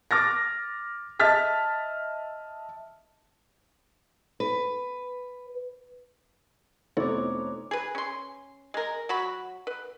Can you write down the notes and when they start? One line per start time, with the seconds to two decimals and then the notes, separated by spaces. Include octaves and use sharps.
0.11 D6 F6 A6 A#6
1.20 D#5 E5 A5 F6 A6 B6
4.40 B4
6.97 F1 B3 D#4 E4 A4 C5 C#5 D6
7.71 G#4 B4
7.95 C#4 C6
8.74 G#3 A#4
9.09 F#3 F#4 B5
9.67 B4